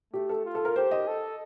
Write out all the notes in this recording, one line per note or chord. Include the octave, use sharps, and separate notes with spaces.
A3 G4
A4
F4
A4
A#4
G4 C5
D#5
A4